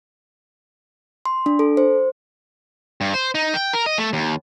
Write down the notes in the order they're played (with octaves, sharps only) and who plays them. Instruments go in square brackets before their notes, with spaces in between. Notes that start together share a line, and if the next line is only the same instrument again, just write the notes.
[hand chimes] C6
D4
A4
C5
[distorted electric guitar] G2
C5
D#4
G5
A#4
D#5
A3
D#2